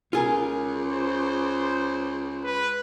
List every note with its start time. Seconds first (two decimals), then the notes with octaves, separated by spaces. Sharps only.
0.13 C#2 F4 G#4 A#4
0.92 C5
2.44 B4